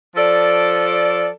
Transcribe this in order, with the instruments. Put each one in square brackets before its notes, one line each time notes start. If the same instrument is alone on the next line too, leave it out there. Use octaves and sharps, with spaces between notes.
[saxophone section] F3 A4 D5